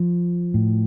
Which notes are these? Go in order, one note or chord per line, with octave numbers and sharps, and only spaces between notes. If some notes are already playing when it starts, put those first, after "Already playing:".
Already playing: F3
A2